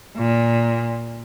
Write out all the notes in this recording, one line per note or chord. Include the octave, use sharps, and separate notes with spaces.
A#2